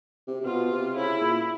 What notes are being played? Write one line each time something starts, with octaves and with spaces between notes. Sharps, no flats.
C3
C3
B2 F4
C3
C#3 E4
A#2